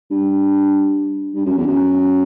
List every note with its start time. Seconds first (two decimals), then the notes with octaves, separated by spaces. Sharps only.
0.11 G2
1.34 G2
1.45 F#2
1.57 E2
1.67 F#2